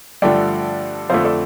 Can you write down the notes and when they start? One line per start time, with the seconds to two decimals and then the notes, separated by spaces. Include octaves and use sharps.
0.22 G2 D3 F3 A3 D5 G5
1.10 F2 D3 F3 A3 C5 F5
1.24 A4 D5